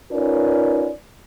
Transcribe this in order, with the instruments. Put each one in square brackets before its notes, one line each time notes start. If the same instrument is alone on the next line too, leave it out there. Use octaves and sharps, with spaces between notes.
[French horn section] C#4 D#4 F4 A#4 B4 D5